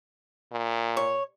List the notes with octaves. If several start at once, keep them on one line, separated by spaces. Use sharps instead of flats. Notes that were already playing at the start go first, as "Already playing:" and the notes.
A#2
C#5